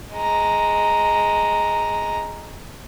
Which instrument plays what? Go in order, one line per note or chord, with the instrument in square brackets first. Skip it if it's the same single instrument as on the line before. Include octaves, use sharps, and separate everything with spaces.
[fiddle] G#3 A#5